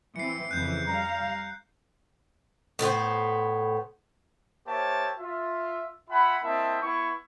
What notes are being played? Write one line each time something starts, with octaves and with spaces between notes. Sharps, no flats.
E3 C4 C7 C#7
F2 C#3 E3 F#6 G6
G3 F5 A#5
A2 B3 E4 C5
A#3 G4 C5 C#5 E5 A5
F4 E5
F4 E5 F#5 G#5 B5
A#3 C4 E4 D#5 E5 A5
B3 E4 C#6